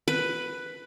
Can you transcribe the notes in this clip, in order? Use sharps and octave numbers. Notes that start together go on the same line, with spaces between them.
B4